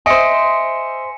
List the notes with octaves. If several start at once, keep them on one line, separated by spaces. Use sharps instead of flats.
C5 D#5 E5 G#5 C6 D#6 C#7